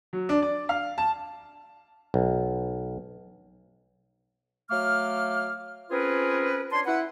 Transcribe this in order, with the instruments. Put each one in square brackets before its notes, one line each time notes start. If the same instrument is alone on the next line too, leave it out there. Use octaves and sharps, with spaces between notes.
[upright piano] F#3
D4
D5
F5
A5
[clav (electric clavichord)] B1
[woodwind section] F#3 A3 F5 D6 F6
C4 C#4 F4 G#4 A#4 B4
D4 C#5 A5 C6
E4 B4 F#5